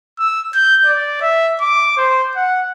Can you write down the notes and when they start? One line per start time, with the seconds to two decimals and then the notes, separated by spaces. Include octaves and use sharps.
0.19 E6
0.55 G6
0.85 D5
1.22 E5
1.61 D6
1.97 C5
2.36 F#5